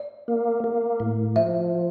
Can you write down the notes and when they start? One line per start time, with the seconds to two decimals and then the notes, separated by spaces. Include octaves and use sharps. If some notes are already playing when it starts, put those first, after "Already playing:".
Already playing: D5
0.28 A#3
0.64 A#3
1.00 A2
1.36 F3 E5